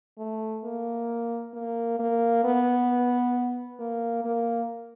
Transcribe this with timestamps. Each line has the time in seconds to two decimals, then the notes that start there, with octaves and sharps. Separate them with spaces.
0.18 A3
0.64 A#3
1.54 A#3
1.99 A#3
2.44 B3
3.79 A#3
4.24 A#3